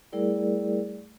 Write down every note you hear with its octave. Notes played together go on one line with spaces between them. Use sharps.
G3 A3 E4 G#4 A#4 D5